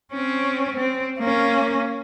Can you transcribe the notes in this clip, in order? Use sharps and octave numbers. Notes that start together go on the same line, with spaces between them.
C4 C#4
C4
A#3 C#4